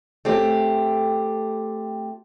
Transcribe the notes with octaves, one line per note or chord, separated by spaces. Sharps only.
A3 C4 G4